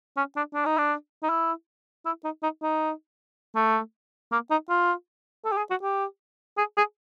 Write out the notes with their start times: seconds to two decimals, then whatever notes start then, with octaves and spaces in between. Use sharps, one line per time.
0.17 C#4
0.36 D4
0.54 D4
0.66 D#4
0.78 D4
1.23 D#4
1.30 E4
2.06 E4
2.24 D#4
2.43 D#4
2.62 D#4
3.56 A3
4.32 A#3
4.51 D#4
4.70 F4
5.45 A4
5.52 G4
5.57 G#4
5.70 F#4
5.82 G4
6.58 G#4
6.77 G#4